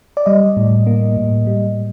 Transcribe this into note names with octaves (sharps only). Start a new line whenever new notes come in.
D5
G3 D#5
A2
A#3
A2
G3